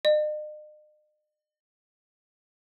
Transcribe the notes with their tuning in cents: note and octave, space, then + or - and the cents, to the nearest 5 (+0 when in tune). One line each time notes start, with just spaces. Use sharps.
D#5 -45